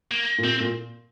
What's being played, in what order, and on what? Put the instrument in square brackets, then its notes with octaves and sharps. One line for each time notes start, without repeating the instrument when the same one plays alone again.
[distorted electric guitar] A#3
[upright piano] A#2
[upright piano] C3 [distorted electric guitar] C4
[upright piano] A#2